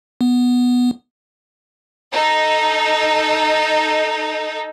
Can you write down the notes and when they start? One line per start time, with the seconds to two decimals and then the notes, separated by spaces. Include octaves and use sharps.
0.21 B3
2.11 D#4 A4